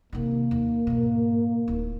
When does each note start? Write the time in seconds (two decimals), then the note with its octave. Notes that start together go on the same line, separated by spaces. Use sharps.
0.13 C3 D#3 A#3
0.51 D#2
0.87 G#2 B2
1.68 D1 D#4